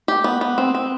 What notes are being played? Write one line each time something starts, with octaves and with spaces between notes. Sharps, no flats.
G4
B3
B3
C4
C4